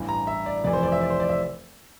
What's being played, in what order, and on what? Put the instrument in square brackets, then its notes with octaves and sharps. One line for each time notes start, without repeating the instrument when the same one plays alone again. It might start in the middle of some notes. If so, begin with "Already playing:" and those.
Already playing: [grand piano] A1 G2 E3
A#5
E5
D5
F1 F2 E3 D5
C5
D5
E5
D5
C5
D5
E5